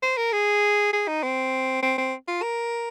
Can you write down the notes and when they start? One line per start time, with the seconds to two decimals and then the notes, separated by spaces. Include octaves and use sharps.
0.03 C5
0.17 A#4
0.32 G#4
0.93 G#4
1.07 D#4
1.23 C4
1.82 C4
1.98 C4
2.28 F4
2.42 A#4